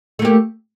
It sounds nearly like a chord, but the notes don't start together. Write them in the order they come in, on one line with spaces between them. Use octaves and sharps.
A3 A#3 G4